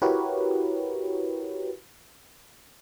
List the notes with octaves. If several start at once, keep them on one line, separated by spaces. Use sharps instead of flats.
E4 F#4 G4 A#4 B4 C#5